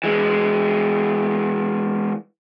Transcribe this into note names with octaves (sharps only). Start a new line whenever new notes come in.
E3 G#3